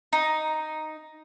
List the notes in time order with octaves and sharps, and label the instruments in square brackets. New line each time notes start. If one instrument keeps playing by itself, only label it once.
[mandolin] D#4